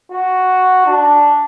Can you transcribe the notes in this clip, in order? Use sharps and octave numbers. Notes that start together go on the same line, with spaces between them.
F#4
D4